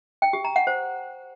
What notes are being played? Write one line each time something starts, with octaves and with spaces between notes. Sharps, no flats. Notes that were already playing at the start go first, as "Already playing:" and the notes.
G5
G4
A#5
F#5
C5